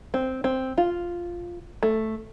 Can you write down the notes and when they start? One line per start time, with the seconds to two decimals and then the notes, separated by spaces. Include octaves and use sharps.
0.14 C4
0.44 C4
0.78 F4
1.83 A3